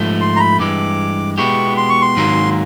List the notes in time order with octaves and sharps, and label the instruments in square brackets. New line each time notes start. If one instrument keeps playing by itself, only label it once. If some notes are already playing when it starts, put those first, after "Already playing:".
Already playing: [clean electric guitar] G#2 F3 A3
[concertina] C6
A#5
B5
[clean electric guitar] G2 E3 G#3 [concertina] D6
[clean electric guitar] B2 G#3 B3 E4 G4 [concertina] C#6
[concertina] C6
C#6
C6
[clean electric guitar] G#2 D#3 F#3 A#3